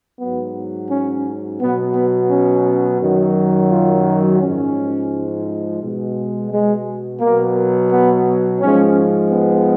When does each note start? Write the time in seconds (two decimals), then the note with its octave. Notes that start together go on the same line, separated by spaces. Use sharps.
0.20 G#2 F#3 B3
0.90 C#4
1.61 B2 F#3 B3
1.95 B3
2.30 C#4
3.00 F#2 D#3 F#3
3.71 F4
4.40 G#2 F3 G#3 C#4
5.81 B2 G#3
6.51 G#3
7.21 B2 F#3 A#3
7.91 B3
8.61 G#2 F3 G#3 C#4
9.31 B3